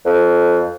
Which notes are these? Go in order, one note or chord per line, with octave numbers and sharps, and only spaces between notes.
F2